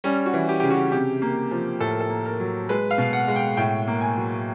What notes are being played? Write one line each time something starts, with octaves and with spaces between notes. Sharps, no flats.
G3 C#4
F#4
E3
G4
C#3 G4
F#4
C3 G4
A#3
F3
A2 A4
A#4
A4
A#3
A#4
F#3
G#3 B4
F5
B2
F#5
G#3
G5
A2 G5
A#3
G#5
F#3